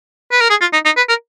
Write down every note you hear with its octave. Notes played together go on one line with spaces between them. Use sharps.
B4
A#4
G#4
F4
D#4
D#4
B4
A#4